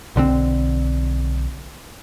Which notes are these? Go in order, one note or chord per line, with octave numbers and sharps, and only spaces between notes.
B1 D3 E3 C4